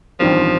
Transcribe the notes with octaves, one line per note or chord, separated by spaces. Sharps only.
A1 G2 D#3 F3 G3 C4